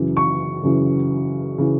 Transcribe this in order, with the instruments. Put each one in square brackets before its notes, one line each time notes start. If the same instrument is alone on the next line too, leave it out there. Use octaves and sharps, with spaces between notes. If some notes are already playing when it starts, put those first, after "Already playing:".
Already playing: [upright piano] F#2 C#3 E3
C#6
F#2 C#3 E3
C#3 E3